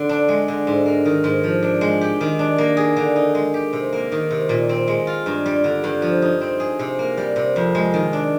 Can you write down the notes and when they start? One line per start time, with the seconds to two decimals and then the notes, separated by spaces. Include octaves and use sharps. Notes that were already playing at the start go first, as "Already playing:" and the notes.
Already playing: D3
0.09 D4
0.29 G#3
0.48 D3
0.67 G#2
0.86 A#3
1.05 D#3
1.24 G#2
1.43 F3
1.62 D4
1.81 G#3
2.01 G4
2.21 D#3
2.39 D4
2.58 A#3
2.77 G#4
2.97 D3
3.16 D#4
3.35 G#3
3.54 G4
3.73 C3
3.92 A#3
4.12 D#3
4.31 C3
4.49 A#2
4.69 C4
4.88 G#3
5.07 F4
5.26 G2
5.46 G3
5.64 D3
5.84 G2
6.02 F3
6.22 D#4
6.41 C4
6.60 G#4
6.79 C3
6.99 A#3
7.17 G3
7.36 C3
7.56 F2
7.75 G#3
7.94 D#3
8.13 D4